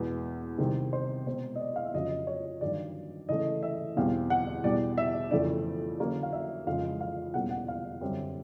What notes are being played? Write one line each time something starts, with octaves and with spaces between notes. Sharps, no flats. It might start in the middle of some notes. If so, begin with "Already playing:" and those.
Already playing: E2 B2 G#3 B3
C3 D#3 G3 C4
C5
B2 G#3 C4 C5
D#5
D5
F5
E5
F2 C#3 F#3 D#5
C#5
G2 D#3 F#3 D5
C#3 E3 A3 D#5
E5
E2 B2 G3 C4 F5
F#5
E2 B2 G3 D5
E5
F2 C#3 E3 A3 D5
D3 F#3 A#3 C#4
F5
E5
F2 C#3 E3 G#3 F5
F5
E2 B2 G3 A#3 C#4 F#5
F#5
F5
F#2 D3 G3 C4